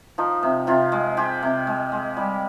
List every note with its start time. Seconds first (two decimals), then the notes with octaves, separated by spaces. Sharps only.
0.18 F3 D#4
0.43 C3
0.67 C3 F4
0.92 G#3
1.17 G#3 G4
1.43 C3
1.67 G#3
1.92 G#3
2.17 G3